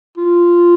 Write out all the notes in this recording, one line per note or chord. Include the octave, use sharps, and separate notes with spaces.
F4